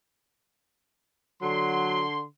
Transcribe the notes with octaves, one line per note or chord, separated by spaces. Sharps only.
D3 F#3 C6